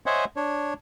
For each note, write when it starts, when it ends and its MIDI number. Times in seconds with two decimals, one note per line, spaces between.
0.06 0.25 72
0.06 0.25 73
0.06 0.25 75
0.06 0.25 76
0.06 0.25 78
0.06 0.25 80
0.36 0.74 62
0.36 0.74 73